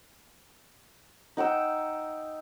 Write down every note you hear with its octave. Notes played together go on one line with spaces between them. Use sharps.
D#4 F#5 G5 E6